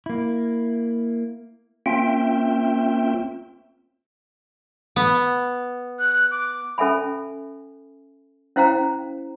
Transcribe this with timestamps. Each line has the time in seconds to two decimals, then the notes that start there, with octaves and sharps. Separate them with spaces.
0.06 A#3 E4
1.86 A#3 C4 C#4 F4 E5 G5
4.96 B3
5.99 F#6
6.31 D6
6.78 C#4 A4 E5 G#5 B5
8.56 C#4 E4 C5 F5 G5 A#5